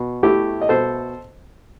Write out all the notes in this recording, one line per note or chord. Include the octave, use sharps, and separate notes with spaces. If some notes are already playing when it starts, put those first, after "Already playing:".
Already playing: B2
A3 E4 G4
D#5
B2 A4 C5